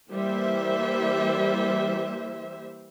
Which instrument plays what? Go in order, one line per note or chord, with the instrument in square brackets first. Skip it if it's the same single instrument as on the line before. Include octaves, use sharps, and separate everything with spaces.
[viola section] E3 G3 A#3 C5 E5